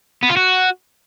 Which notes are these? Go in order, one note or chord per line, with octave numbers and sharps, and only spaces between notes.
B3
F4
F#4